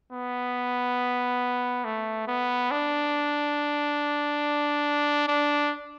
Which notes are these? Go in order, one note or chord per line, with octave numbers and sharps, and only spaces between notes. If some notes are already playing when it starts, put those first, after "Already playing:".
B3
A3
B3
D4
D4